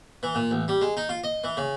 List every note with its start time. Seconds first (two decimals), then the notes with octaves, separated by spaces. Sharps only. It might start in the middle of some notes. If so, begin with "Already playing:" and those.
0.23 E3
0.35 A#2
0.51 A1
0.68 G3
0.81 G#3
0.97 D#4
1.09 F4
1.24 D#5
1.44 E3
1.57 C#3